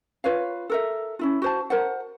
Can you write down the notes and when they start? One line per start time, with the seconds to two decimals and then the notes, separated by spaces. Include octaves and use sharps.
0.24 F4 B4 C#5 F5
0.70 A4 A#4 E5
1.19 C#4 E4 F4
1.42 F#4 C5 A5
1.70 A#4 C5 F#5